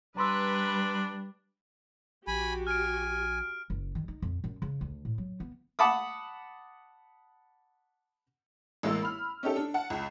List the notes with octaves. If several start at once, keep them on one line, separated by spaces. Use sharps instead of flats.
G3 D4 B4 A#5 C6 E6
A#1 F#4 G4 G#5 B5
G#5 F6 D7
F#1
D#3
D#4
F2
F#2
C#3
D2
A2
F#3
B3
F#5 A5 B5 D6 D#6
A1 G#3 A#3 A#4 E6
B5 F6
C#4 D#4 G4 A4
D4
F#5 A5
C#2